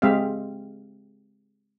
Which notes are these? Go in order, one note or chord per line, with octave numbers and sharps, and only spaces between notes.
G#3 C4 G4 E5 F5